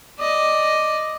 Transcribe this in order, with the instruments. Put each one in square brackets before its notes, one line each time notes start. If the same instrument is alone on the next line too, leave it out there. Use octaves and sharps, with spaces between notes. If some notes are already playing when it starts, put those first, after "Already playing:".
[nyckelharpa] D5 D#5